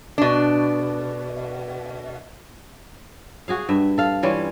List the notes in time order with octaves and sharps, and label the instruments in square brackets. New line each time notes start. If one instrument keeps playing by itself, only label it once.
[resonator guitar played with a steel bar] B2 D4
[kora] F#4 G#4 F5
G2 E5
A4 F5
E3 G3 C#4 F4